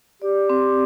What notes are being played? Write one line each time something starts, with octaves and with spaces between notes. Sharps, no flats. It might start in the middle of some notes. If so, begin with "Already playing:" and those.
G4 D5
C4